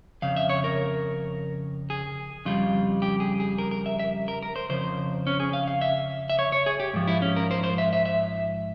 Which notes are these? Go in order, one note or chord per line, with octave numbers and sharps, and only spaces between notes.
F2 C#3 F5
E5
C#5
A#4
G#4
F2 C#3 G3 F4
G4
G#4
G#4
A#4
A#4
E5
E5
A#4
A#4
C5
F2 C#3 F3 C5
C#4
G#4
F5
F5
E5
E5
C#5
C#5
G#4
G4
G#2 F3
E4
C#4
A#4
C5
C5
E5
E5
E5